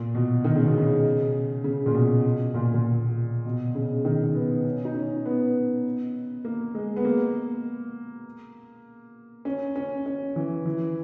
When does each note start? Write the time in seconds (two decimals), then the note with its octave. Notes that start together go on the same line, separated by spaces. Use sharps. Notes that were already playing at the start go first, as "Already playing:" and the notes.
Already playing: A#2
0.15 B2
0.45 D#3
0.56 C#3
0.66 B2
0.78 C#3
1.64 C#3
1.86 A#2
1.94 B2
2.54 A#2
2.74 A#2
3.45 B2
3.75 C#3
4.05 D#3
4.35 B3
4.64 C#4
4.85 D#4
4.94 C#4
5.26 B3
6.45 A#3
6.75 G#3
6.96 B3
7.05 A#3
9.45 C#4
9.76 C#4
10.06 C#4
10.36 E3
10.65 E3